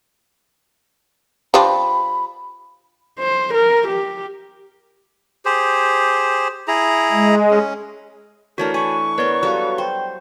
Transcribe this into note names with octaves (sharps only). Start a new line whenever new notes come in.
F3 D4 G4 F5 G5 B5
C5
A#4
G4
G4 G#4 C5
E4 G#4 A#5
G#3
C#4
E3 A3 D4 F#4 A#4 C#5 A5
B4 G#5 C#6
B3 A#4 B4 C#5 D5
F#3 G3 F#4 A4 F5
C5 G5